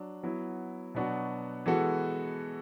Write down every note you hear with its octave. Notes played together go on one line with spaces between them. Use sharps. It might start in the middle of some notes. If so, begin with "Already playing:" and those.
Already playing: F#3 D4
F#3 B3 E4
B2 F#3 B3 D4 F#4
E3 G#3 B3 F#4 A4